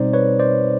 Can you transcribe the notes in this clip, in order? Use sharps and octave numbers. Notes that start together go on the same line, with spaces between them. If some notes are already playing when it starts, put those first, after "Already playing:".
Already playing: B2 G3 C4 D#4 C5 D5
B4 C#5
C5 D5